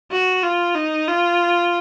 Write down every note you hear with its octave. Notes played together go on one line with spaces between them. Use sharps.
F#4
F4
D#4
F4